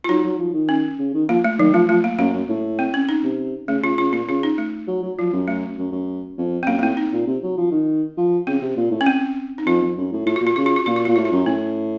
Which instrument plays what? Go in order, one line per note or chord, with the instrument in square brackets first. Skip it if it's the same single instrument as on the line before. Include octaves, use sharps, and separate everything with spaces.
[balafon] F4
[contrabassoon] F#3 [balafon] D#4
[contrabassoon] F#3
F3
D#3
[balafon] C#4
[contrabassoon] C#3
D#3
[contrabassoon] F3 [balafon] A#3
[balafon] A3
[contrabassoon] D#3 [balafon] F#3
[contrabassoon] F3 [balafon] A3
[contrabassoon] F3 [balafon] A3
[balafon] A#3
[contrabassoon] F#2 [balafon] A#3
[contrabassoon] F#2
A2
[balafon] C4
C#4
D#4
[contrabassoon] C3
[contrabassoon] C#3 [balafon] A3
[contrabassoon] C#3 [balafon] F4
[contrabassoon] C#3 [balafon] F4
[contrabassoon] A#2 [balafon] F4
[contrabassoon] C#3 [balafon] F4
[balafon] D#4
A3
[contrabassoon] F#3
F#3
[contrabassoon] F3 [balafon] F#3
[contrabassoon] F#2
[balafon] A3
[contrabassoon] F#2
F#2
F2
[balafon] C4
[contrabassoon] F#2 [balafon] A#3
[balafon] A#3
[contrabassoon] A2 [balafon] C4
[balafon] D#4
[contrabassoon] A#2
C3
F#3
F3
D#3
F3
[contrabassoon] C#3 [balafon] C4
[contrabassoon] C3
A#2
A2
[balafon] C#4
C4
D#4
[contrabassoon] F2 [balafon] F4
[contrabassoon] F2
F#2
A2
[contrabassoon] A2 [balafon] F4
[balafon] F#4
[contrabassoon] A#2
[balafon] F4
[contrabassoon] C#3 [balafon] F#4
[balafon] F4
F#4
[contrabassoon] A#2 [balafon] F4
[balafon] F#4
[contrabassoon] A#2 [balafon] F4
[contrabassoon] A2 [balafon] F#4
[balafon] F4
[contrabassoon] F#2
[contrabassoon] A2 [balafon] C#4